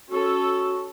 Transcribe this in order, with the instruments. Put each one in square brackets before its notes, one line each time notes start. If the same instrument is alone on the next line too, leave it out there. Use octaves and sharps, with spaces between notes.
[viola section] C#4 A4 [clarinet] F#4